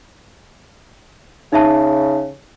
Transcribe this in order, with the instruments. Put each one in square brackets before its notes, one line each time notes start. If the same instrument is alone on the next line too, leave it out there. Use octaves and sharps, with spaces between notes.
[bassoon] C#3 [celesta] D#4 E5 A5